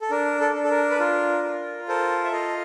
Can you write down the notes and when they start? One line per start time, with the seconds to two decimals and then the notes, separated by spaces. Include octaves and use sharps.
0.01 A4
0.11 D4 A#4
0.41 A4
0.55 D4
0.63 A4
0.70 A#4
0.90 B4
1.00 F4 A#4
1.44 F4
1.88 A4 A#4 C5
2.24 E5
2.32 F4 D#5 F5